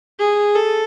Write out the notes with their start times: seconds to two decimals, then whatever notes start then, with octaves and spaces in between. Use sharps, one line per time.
0.19 G#4
0.56 A4